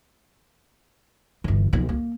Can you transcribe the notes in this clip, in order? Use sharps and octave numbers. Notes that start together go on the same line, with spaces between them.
G1 E3
B1 F3
A#3